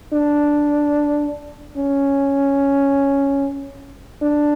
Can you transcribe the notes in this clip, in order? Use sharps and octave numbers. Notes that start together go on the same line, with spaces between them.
D4
C#4
D4